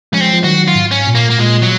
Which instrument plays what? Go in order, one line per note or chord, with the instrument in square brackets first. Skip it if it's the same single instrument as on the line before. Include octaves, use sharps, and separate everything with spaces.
[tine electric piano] F3 G#3 [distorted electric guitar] C#4
[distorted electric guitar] C4
[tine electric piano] F3
[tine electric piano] D#3 F#3 [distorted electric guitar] F#4
[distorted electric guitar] F4
[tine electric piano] G#2
[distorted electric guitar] C#4
[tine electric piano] A#2
[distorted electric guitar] A#3
A#3
[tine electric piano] A#2 [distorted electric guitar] G#3
[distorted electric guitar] F#3